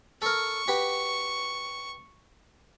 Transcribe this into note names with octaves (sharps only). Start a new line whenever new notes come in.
A4 A#4 C#6
F#4 G4 B4